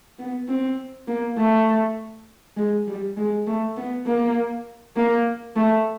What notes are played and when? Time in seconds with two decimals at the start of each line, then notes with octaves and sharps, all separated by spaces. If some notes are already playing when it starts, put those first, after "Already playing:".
0.19 B3
0.48 C4
1.08 A#3
1.38 A3
2.57 G#3
2.87 G3
3.17 G#3
3.47 A3
3.77 B3
4.06 A#3
4.96 A#3
5.56 A3